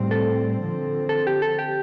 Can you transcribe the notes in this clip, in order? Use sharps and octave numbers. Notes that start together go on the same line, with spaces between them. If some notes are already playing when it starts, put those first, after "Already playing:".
Already playing: A2 G3 C4
A4
D3 F3 C4
A4
G4
A4
G4